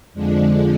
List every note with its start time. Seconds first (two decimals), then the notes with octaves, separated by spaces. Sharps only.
0.14 F2 D3 F3 G#3 D4